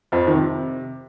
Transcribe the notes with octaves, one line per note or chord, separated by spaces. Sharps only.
F2 F3
D#3
C3